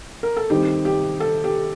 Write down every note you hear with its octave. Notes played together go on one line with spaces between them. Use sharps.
A#4
A4
D#3 G3 C4 D#4 G4
G4
A4
G4